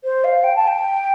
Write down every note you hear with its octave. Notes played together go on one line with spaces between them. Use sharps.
C5
F5
G5
A5
G5